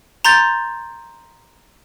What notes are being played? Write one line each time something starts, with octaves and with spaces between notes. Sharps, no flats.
A#5 C6 G6 A6